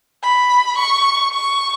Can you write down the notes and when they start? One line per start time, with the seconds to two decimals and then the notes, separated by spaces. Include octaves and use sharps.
0.22 B5
0.77 C#6
1.33 C#6